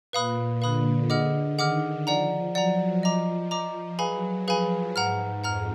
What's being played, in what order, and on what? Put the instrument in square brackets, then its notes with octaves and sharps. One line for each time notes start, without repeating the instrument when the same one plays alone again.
[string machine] A#2 [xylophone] B4 F5 B5 D#6 F#6
[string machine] D3 [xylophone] B4 F5 B5 D#6 F#6
[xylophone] G#4 D#5 F#5 D6 F6
[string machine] D#3 [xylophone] G#4 D#5 F#5 D6 F6
[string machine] F3 [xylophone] D5 F#5 A#5
[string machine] F#3 [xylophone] D5 F#5 A#5
[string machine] F3 [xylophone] D#5 A#5 D6
[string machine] F3 [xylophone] D#5 A#5 D6
[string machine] F#3 [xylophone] G#4 B4 F5 G#5 B5
[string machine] F3 [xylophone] G#4 B4 F5 G#5 B5
[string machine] G#2 [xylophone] F#5 A#5 F6
[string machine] F2 [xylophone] F#5 A#5 F6